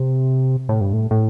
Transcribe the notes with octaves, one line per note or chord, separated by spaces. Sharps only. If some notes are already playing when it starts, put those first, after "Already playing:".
Already playing: C3
A2
G2
A2
A2